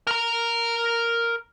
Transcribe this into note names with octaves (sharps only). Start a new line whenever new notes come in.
A#4 A#5